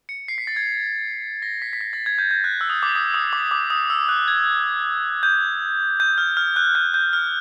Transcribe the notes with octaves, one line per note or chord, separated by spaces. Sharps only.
C#7
C7
B6
A6
G#6
A#6
B6
B6
A#6
A6
G#6
G6
G6
F#6
E6
D#6
D6
D#6
D#6
D6
D6
D#6
E6
F#6
G#6
G6
G6
F6
F6
F#6
G6
G6
F6